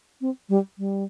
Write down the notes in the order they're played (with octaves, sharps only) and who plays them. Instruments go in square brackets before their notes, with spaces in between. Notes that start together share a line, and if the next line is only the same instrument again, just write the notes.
[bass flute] C4
G3
G3